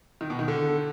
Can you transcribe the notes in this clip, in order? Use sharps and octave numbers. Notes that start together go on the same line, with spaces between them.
D#3
B2
D#3
D3